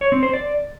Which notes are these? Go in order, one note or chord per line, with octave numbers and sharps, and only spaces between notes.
C#5
C4
C5
D5